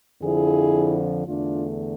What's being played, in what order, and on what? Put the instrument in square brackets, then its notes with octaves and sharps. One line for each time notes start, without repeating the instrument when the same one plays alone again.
[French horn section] F2 D3 F3 E4 G#4
E2 D3 A3 D4 F4